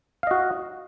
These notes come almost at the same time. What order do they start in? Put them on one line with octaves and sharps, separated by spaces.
F5 D#5 F#4